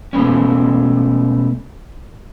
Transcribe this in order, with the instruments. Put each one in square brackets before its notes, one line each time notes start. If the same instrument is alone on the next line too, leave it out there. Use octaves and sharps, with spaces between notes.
[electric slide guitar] B2 G#3 A3 B3 C#4